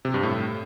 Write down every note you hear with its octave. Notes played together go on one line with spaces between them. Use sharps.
C3
G2
A2